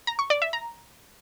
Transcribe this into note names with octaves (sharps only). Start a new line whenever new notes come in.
A#5
C#6
D5
E5
A#5